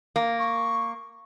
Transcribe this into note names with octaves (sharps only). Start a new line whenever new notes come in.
A#3
C#6